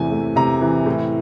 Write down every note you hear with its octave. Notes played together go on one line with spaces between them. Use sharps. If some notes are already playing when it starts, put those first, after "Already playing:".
Already playing: E2 C3 E3 A3 G#5
A3
C3 A#5
E3
A2